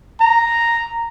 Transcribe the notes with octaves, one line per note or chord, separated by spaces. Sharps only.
A#5